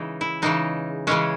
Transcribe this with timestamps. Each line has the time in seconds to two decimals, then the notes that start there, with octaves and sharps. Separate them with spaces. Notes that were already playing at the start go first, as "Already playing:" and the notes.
Already playing: C#3 E3 G#3 D#4
0.21 E4
0.42 C#3 E3 G#3 D#4
1.07 C#3 E3 G#3 C#4